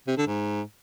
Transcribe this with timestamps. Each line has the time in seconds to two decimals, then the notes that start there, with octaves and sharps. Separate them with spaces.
0.07 C3
0.17 D3
0.27 G#2